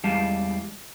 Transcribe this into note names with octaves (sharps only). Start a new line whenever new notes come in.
E2 G3 G#3 F5 A5